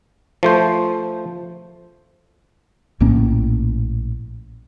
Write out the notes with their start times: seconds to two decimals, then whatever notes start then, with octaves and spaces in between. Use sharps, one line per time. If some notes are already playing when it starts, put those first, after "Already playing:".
0.43 F3 A3 C5
3.00 A#1 A2 A#3 C#4